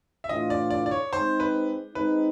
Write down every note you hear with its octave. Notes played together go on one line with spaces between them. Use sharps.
E5
A2 E3 A3 D4 F4 D#5
D5
D5
D5
C#5
G#3 C4 D#4 C5
B4
G#3 C4 D#4 B4